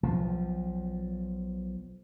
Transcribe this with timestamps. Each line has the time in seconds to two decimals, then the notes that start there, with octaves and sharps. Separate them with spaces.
0.03 B1 F3